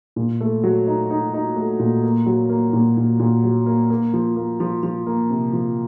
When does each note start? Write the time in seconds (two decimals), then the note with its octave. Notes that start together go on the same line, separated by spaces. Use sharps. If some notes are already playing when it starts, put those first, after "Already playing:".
0.16 A#2
0.41 A3
0.64 F#3
0.87 D#4
1.10 D#4
1.34 D#4
1.56 A3
1.79 A#2
2.03 A#3
2.26 F#3
2.49 A#3
2.73 A#2
2.97 A#2
3.20 A#2
3.44 F#3
3.66 A#3
3.90 A#3
4.13 F3
4.36 A#3
4.60 F3
4.83 F3
5.06 A#3
5.30 C3
5.53 F3